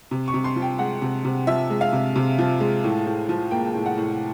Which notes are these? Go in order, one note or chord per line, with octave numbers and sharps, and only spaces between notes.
C3
C#6
C3
C6
F3
G5
G#3 F#5
C3
C3
F3 E5
G#3
F5
C3
C3
F3
G#3
A2
A2
F3
A#3 G5
A2
F#5
A2